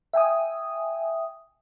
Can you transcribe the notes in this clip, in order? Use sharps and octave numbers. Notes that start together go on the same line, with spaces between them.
E5 G5 G#5 D#6